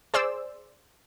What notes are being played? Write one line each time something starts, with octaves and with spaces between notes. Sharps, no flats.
G#4 C5 D5 E6